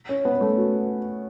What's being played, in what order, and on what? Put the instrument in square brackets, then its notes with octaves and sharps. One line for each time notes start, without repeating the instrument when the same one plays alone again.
[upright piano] C#4
B3
A3
F#4